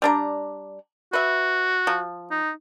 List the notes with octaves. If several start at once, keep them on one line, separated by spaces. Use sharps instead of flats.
G3 D4 A#5
F#4 B4 E5
F3
D#4